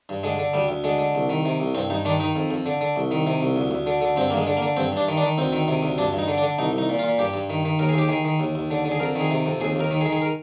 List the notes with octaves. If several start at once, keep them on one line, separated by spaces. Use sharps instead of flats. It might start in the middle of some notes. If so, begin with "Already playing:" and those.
G2
D3 G#3
D3
D2 G3
D2
D3 G#3
D3
C2
D#3
C3
C2
G2 C4
G2 D#4
D#3 D4
D#3 D#4
F2
F2
D3
D3
C2
D#3
C3
C2
D2
D2
D3
D3
G2 C4
G2 A#3
G#3
D3
A#3
D3
G2 C4
G2 D4
D#3
D4
D#3
D2 C4
D#3
C3
D2
G2 D4
G2
D#4
D3
D4
D3
C2 D#4
C2
D#4
A#2
F4
A#2
G2 G4
G2
D#3
D#3
D#2 A#4
G#4
D#2 G4
D#3 G#4
D#3
D#2
D#2
D3
D3
G#4
F2 A#4
D#3
G#4
C3
F2
D#2 G#4
D#2 A#4
D#3
G#4
D#3
G#4
A#4